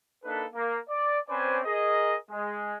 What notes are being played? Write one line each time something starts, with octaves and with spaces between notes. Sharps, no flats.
A#3 D4 D#4 A4 B4
A#3
D5
C4 C#4 B4 C5 D5 G#5
G#4 A#4 D#5
G#3